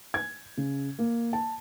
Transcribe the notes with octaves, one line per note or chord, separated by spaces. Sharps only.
G#6
C#3
A#3
A5